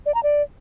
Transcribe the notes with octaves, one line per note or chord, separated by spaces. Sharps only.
D5
A#5
D5